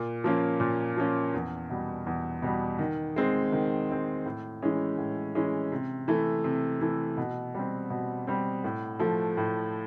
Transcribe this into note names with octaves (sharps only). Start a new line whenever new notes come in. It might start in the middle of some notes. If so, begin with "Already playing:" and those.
Already playing: A#2
F3 A#3 C#4
A#2
F3 A#3 C#4
E2
B2 G3
E2
B2 G3
D#3
G#3 C4
D#3
G#3 C4
A2
E3 G#3 C#4
A2
E3 G#3 C#4
C3
E3 A3
C3
E3 A3
B2
G3 C4
B2
G3 C4
A2
F3 A3
A2